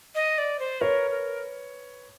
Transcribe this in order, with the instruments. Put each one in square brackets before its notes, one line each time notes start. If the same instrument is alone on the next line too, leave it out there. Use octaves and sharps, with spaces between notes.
[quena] D#5
D5
C5
[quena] A#4 [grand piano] B4 C#5
[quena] A#4